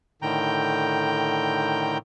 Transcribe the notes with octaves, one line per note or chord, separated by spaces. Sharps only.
A2 D3 D#3 G5 A#5 G6